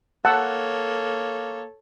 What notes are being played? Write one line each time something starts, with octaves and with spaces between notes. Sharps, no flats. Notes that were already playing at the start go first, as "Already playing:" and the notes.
A#3 A4 C#5 F#5 A5 E6